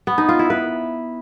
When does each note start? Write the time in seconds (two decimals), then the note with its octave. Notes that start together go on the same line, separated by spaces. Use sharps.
0.07 B3
0.18 D#4
0.29 F4
0.39 E4
0.50 B4